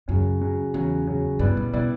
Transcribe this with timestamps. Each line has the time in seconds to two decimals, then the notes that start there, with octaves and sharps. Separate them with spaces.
0.08 F#2 C#3 F#3 C#4
0.41 C#3 F#3 C#4
0.74 E2 C#3 F#3 C#4
1.07 C#3 F#3 C#4
1.39 G2 G3 B3 E4 B4 D5
1.57 A#2
1.73 B2 G3 B3 E4 B4 D5